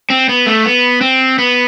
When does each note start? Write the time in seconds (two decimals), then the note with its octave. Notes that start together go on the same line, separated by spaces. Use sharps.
0.10 C4
0.29 B3
0.46 A3
0.65 B3
1.01 C4
1.38 B3